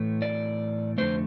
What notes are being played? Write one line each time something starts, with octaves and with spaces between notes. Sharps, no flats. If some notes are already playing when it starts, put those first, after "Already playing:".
Already playing: A2 E3 A3
D5
F2 D3 A3 C5